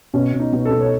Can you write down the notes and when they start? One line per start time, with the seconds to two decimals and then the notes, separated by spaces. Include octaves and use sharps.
0.14 B2 C#4
0.34 B2
0.39 D#4
0.52 B2
0.65 A4
0.71 B2
0.81 C#5